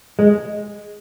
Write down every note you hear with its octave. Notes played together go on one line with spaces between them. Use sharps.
G#3